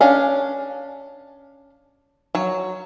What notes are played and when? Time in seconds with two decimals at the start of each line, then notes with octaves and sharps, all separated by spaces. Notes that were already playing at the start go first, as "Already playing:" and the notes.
0.01 C#4 D4 F5
2.35 F#3 C#5